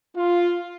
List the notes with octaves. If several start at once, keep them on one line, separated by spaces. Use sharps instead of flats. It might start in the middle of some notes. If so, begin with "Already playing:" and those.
F4